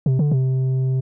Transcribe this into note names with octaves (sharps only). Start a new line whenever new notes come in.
C3
D3
C3